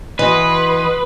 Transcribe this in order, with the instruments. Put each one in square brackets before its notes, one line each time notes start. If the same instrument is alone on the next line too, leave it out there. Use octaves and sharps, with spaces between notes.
[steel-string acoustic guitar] E3 D#5 [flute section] F#4 C6 D#6 [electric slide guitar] B4